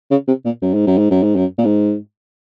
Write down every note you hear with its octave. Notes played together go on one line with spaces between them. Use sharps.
C#3
C3
A#2
F#2
G#2
F#2
G#2
F#2
G#2
F#2
A#2
G#2